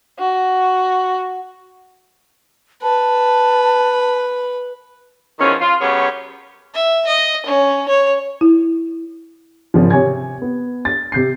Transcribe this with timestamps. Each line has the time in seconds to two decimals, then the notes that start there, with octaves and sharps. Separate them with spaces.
0.19 F#4
2.83 B4 A5
5.39 E2 D#3 F3 C#4
5.61 F4
5.80 F#2 B3 G4 G#4 C#5
6.74 E5
7.07 D#5
7.46 C#4
7.89 C#5
8.41 E4
9.74 G#1 C#3 F3
9.91 C3 C#5 G#5 G#6
10.42 B3
10.85 A6
11.12 C3 G6 C7